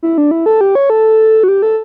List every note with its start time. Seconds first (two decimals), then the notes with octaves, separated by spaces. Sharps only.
0.03 E4
0.18 D4
0.31 E4
0.46 A4
0.61 G4
0.75 C#5
0.90 A4
1.43 F#4
1.48 G4
1.62 A4